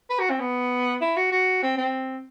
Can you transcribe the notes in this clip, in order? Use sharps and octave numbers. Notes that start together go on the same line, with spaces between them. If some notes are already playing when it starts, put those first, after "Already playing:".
B4
F#4
C4
B3
E4
F#4
F#4
C4
C4